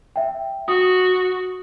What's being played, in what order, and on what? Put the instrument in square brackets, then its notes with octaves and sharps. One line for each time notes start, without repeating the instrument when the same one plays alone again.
[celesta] E5 G5
[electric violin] F#4 [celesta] D#6